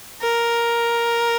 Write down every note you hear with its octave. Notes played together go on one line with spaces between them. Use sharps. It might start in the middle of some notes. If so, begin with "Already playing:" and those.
A#4